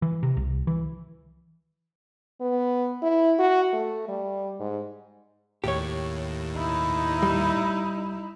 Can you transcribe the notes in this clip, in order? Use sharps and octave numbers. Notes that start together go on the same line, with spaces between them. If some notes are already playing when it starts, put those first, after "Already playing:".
E3
C3
C2
E3
B3
E4
F#4
A3
G3
G#2
D#2 A2 G4 C#5
D#4 E4
G3